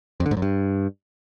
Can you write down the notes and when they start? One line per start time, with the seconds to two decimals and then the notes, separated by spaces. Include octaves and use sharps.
0.20 F2
0.26 D3
0.31 G#2
0.37 F#2
0.42 G2